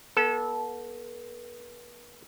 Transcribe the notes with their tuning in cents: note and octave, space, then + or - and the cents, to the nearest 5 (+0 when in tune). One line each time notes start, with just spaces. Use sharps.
B3 -40 A4 -15